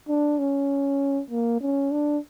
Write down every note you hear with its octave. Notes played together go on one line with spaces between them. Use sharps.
D4
C#4
A#3
C#4
D4